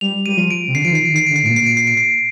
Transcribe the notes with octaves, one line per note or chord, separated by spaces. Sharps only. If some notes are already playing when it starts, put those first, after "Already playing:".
G3 F7
G3 D#7
F3
D7
C3
D3 C7
F3 D7
D#3 C7
D7
D#3
C7
D3 D7
C7
A2
A#2 D7
C7
D7
C7
D7
C7